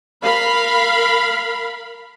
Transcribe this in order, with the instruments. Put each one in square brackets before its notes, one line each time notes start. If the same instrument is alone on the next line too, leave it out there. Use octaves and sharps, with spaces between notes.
[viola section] A#4 F5 B5